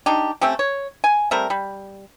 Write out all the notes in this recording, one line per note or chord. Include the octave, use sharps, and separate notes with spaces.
D4 D#4 G4
A3 C4 C#4 G4
C#5
G#5
G3 A3 C4 A#4
G3